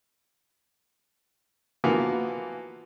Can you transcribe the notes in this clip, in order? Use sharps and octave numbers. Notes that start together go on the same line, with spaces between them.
E3 F3 A#3 B3 F4 F#4